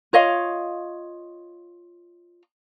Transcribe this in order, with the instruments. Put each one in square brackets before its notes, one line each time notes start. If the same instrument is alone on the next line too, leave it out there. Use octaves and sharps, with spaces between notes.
[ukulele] F4 C#5 D#5 F5